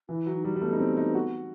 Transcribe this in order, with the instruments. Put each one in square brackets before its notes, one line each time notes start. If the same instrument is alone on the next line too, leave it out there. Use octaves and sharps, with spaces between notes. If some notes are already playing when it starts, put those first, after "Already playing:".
[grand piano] E3 [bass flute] E4
[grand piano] F#3
[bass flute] D#4
[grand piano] G3
G3
[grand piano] A3 [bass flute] B3
[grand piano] D#4
C4
D#4
F#4